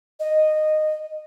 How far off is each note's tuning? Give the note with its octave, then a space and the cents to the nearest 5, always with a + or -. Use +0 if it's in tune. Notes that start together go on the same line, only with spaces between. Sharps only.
D#5 -10